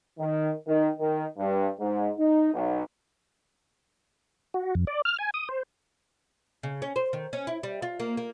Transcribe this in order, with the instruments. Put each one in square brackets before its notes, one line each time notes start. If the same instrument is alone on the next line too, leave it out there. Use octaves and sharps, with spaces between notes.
[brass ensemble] D#3
D#3
D#3
G2
G#2
D#4
B1
[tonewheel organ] F#4
F2
D5
F6
G#5
D#6
C5
[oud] C#3
C#4
C5
D#3
C#4
E4
G3
F4
A#3
A#3